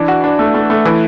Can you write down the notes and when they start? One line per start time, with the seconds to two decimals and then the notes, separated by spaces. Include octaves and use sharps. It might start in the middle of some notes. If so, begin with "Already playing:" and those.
Already playing: E3 D4
0.08 F#4
0.24 D4
0.39 A3
0.54 A3
0.70 A3
0.85 E3